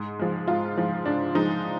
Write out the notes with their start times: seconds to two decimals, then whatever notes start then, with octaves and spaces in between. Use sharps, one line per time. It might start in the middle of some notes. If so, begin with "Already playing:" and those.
Already playing: G#2
0.19 F3 G#3
0.48 G#2 F4
0.77 F3 G#3
1.05 G#2 D4
1.35 F3 G#3 D#4